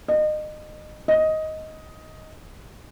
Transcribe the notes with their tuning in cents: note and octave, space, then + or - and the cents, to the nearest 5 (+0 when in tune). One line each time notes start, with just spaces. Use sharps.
D#5 -30
D#5 +10